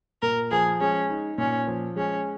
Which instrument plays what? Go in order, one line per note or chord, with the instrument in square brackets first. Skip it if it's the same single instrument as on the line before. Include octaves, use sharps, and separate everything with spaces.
[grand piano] A#2 [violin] A#4
[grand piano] F3 [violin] G#4
[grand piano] G#3 [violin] C#4
[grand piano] D#4
[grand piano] A#2 [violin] C#4
[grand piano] F3
[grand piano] G#3 [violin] C#4